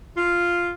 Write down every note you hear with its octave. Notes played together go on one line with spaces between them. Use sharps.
F4